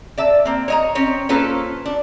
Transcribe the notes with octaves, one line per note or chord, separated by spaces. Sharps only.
D5 E5 A5
A#3 C4
C#5 D#5 A#5
C4 C#4 C#5
A#3 C#4 F4 A4 B4 C5
D4